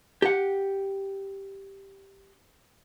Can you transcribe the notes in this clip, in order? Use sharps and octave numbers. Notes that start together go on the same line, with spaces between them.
G4 F#5